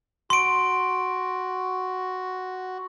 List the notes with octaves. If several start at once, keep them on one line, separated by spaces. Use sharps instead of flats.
F#4 C6 D7